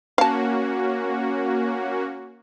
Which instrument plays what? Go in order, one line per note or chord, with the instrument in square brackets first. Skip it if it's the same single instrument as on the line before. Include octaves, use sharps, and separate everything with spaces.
[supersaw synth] A#3 C#4 F#4 [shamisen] F5 A5